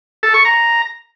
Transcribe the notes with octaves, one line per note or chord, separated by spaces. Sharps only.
A4
C#6
A#5